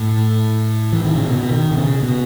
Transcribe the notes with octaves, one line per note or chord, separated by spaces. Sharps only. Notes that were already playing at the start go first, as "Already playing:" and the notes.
Already playing: A2
E3
D#3
C#3
B2
D#3
B2
C#3
B2